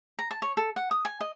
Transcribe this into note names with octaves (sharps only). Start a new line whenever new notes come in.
A#5
A5
C#5
A4
F#5
D#6
G#5
D#5